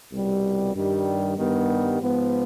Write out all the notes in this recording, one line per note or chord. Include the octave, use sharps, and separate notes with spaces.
C2 B2 G3
G2 D#3 G3
G2 D#3 G3 B3
G#2 F3 B3